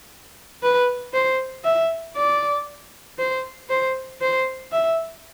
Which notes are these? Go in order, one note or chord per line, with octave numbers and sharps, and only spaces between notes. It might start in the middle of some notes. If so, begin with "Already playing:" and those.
B4
C5
E5
D5
C5
C5
C5
E5